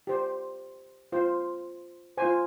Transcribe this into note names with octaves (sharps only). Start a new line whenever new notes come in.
G4 C5
F4 C5
F4 C5 G#5